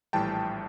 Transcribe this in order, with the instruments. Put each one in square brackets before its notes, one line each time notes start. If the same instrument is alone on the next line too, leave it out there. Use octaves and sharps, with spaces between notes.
[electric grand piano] A#1 A2 E3 G3 G5 A5